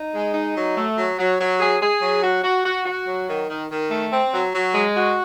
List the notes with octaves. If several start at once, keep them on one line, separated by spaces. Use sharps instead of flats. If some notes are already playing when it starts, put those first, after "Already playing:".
Already playing: D#4
G#3
D#4
F#3
A3
F#3
F#3
F#3
G#4
G#4
F#3
F#4
F#4
F#4
F#4
F#3
D#3
D#3
D#3
A3
C4
F#3
F#3
G#3
F#4